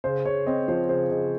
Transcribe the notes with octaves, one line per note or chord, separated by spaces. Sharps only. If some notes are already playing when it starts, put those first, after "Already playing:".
C#3 C5
C#3 C#5
C4 D#5
F3 C5
C#3 C5
C#3 D#5